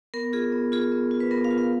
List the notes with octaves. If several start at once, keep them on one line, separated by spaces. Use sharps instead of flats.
B3 A#4
F4 G#4
B3
F4 G#4
B3
F4
B4
B3 A#4
F5
F4
F5